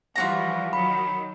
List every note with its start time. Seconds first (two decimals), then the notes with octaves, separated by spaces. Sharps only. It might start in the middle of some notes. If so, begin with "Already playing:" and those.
0.16 E3 F3 G3 F4 F#4 A#5
0.73 D#3 F#3 B5